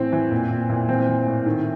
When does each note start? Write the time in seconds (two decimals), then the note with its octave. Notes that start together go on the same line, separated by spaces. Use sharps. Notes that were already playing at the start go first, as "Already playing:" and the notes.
Already playing: A2 E3 C4
0.12 E3
0.32 A#2
0.51 A#2
0.70 A#2
0.89 E3 C4
1.08 E3
1.27 A2
1.46 D#3